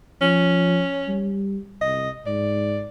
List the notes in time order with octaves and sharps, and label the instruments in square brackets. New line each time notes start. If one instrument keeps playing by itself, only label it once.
[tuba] F3 [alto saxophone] C#4
[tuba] G3
[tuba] C2 [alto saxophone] D#5
[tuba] G#2 [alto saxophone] D5